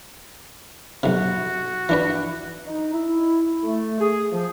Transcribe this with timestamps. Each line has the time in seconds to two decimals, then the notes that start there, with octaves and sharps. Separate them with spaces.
1.03 B1 C3 F#4
1.89 E3 D4 B4
2.66 D#4
2.94 E4
3.64 A3
4.00 G#4
4.32 F3